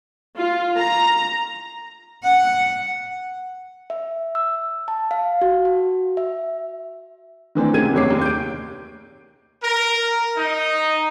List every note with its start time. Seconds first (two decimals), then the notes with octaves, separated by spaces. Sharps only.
0.37 F4
0.78 A#5
2.24 F#5
3.90 E5
4.35 E6
4.88 A5
5.11 F5
5.41 F#4
5.65 F#4
6.17 E5
7.55 D#3 E3 C4 D4
7.73 C#2 A2 C3 A#3 G#6 D#7
7.93 F#1 E2 C3 C#5 D6 C7
8.10 D#2
8.21 G6 D7
9.62 A#4
10.37 D#4